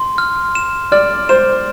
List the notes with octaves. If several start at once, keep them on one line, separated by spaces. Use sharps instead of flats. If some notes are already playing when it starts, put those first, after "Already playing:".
Already playing: C6
F6
E7
D5 F6
C5 E7